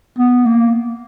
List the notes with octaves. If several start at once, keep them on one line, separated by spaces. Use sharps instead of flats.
B3
A#3